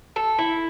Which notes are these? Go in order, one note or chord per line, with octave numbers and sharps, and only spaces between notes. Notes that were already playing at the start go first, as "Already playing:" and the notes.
A4
E4